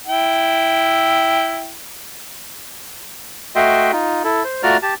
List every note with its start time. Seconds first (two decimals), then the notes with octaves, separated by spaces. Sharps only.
0.07 E4 G5
3.56 A3 F#4 D#5 E5 G5 C6
3.92 D#4 F4
4.24 E4 A4
4.44 C5
4.63 A3 F4 F#4 D5 A#5 F6
4.83 G4 A5